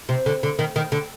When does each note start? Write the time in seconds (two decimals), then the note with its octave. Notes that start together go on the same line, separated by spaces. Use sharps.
0.09 C3
0.26 D3
0.43 D3
0.59 D#3
0.76 D#3
0.92 D3